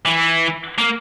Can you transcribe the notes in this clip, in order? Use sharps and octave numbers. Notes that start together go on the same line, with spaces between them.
E3
A#3